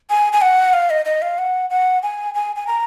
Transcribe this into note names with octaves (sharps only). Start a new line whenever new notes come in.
G#5
G#5
F#5
F5
D#5
D#5
F5
F#5
F#5
G#5
G#5
G#5
A#5